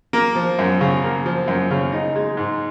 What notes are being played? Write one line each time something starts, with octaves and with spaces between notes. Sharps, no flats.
A#3
F3
F#2
C#3
A#3
F3
F#2
C#3
D#4
G#3
G#2